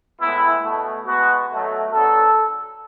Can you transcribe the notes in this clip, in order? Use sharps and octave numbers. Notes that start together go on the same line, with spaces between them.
A2 E3 G#3 B3 E4
B2 A3
B2 G#3 B3 F#4
B2 F#3 A3
D3 F#3 B3 A4